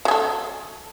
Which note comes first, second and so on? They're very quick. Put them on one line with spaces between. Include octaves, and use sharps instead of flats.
F#3 G#4 A4